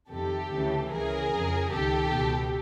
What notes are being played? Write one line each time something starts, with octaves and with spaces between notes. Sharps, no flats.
F2 C3 D#3 G4 A4
D2 C#3 E3
C#2 C#3 E3 G#4 A#4
F2 C#3 E3
C#2 C3 D#3 G4 A4
C#2 B2